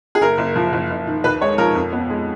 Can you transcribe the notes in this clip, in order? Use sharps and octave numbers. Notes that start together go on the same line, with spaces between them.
G#4
F#1 A#4
F#1
F3
F#1
F#1
D#3
D#2 B4
G#3 C#5
F3 A#4
F2
B3
G#3